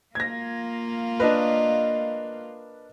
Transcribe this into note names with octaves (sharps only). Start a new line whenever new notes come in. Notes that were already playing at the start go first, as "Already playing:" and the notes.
A#3 F4 G#6 A#6
D4 A#4 B4 D#5